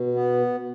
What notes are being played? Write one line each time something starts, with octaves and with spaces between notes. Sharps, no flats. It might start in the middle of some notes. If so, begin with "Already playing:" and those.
Already playing: B2
B3